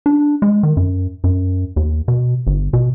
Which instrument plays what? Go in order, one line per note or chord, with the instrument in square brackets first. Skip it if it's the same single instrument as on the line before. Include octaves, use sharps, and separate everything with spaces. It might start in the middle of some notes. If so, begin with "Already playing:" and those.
[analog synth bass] D4
G#3
D#3
F#2
F#2
D#2
B2
G1
B2